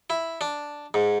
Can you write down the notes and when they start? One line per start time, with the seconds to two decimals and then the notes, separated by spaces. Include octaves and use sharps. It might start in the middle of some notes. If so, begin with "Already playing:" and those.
0.10 E4
0.41 D4
0.94 G#2